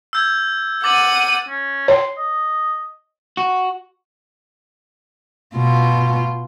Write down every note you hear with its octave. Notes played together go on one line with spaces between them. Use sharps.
E6 G6 G#6
F#5 D6 A6 D#7 F#7
C#4
C#5 C6
D#5
F#4
B2 F4